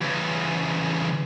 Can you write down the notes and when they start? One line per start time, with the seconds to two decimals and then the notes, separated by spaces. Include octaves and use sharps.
0.02 E2 C#3